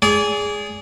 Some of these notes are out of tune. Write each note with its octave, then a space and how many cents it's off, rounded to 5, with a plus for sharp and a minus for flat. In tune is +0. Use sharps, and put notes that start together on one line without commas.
G#4 +0 D5 -30